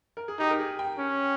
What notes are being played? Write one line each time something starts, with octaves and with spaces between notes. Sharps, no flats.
A#4
G#4
D#4 G4
A#4
G#4
G5
C#4